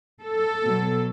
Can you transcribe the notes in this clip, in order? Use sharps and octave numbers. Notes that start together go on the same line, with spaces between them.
A4
B2 F#3